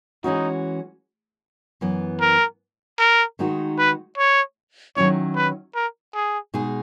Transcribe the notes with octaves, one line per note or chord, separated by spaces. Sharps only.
E3 G#3 C#4 D#4 F#4
F#2 E3 B3
A#4
A#4
D#3 G#3 D#4 F#4
B4
C#5
D#3 F#3 C#4 E4 C#5
B4
A#4
G#4
B2 G#3 D#4 G#4